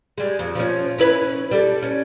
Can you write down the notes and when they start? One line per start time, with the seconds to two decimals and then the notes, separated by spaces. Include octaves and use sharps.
0.18 G3 G#3
0.39 F2
0.55 F3 C#4
0.98 C#4 E4 B4
1.51 G3 A4
1.82 C#4